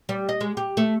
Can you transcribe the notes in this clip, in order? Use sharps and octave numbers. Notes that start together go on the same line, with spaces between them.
G3
D#5
G#3
G4
A3